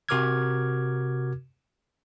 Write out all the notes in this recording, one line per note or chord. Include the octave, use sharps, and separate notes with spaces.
C3 F#4 A#4 D6 F6 G#6